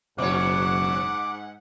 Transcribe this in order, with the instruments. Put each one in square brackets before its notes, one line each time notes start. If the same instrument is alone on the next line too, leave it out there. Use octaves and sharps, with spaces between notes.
[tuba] F#1 [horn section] G#2 F#5 [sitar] B2 C#5 [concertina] D6